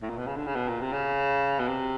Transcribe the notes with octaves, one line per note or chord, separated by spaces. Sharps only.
A2
A#2
B2
C#3
D3
C#3
B2
A#2
C3
C#3
B2
C3